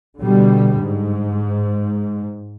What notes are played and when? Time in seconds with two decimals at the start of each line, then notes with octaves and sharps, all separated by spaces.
0.23 B2 D3 G3
0.80 G#2